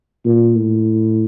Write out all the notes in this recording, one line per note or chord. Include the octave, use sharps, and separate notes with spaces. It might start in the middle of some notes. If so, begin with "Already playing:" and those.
A#2
A2